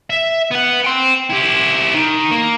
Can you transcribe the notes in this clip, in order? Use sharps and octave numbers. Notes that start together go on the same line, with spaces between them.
E5
B3 F#5
G5 C6
E4 G4
D#3
A#3